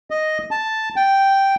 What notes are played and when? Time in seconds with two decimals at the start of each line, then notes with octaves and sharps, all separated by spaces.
0.11 D#5
0.51 A5
0.96 G5